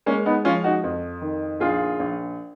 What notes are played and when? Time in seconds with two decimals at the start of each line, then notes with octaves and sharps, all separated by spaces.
0.06 G#3 A#3 C#4
0.26 B3 D#4
0.45 F3 C#4 F4
0.64 D#4 F#4
0.83 F2
1.22 D#3
1.60 A#1 F4 G#4
2.00 A#1